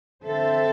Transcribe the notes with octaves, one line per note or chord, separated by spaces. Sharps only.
D3 C4 A4 C5 E5